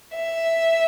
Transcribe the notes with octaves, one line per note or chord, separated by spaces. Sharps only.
E5